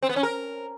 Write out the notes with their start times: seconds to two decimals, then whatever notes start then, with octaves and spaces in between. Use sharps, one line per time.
0.02 C4
0.09 B3
0.16 C#4
0.23 A#4